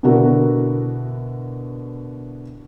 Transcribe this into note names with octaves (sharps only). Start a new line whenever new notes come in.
B2 D3 E4 F#4 A#4